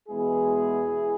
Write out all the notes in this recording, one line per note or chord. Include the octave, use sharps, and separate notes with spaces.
E2 B2 G#3 B3 E4 G#4